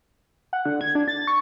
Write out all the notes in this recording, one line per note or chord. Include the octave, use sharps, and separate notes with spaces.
F#5
D3
G#6
D4
A6
C#6